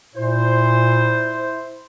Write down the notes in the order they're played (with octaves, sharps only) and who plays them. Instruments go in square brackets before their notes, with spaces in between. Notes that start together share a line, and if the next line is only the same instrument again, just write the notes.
[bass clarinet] A#2 [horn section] E4 C5